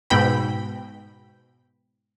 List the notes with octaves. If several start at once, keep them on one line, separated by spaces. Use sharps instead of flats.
G#2 B2 G5 B5